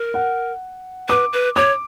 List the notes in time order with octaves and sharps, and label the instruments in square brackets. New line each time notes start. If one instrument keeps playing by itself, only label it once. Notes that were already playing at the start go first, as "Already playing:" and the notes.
Already playing: [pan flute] A#4
[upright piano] F#5
[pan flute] B4 [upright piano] D6
[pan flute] B4
[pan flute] C#5 [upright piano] D6